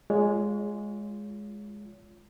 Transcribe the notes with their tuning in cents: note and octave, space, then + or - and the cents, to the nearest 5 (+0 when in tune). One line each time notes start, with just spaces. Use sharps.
G#3 +0 F4 +0 C#5 +30